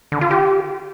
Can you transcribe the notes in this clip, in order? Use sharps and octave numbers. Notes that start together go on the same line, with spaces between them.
D3
F4
G4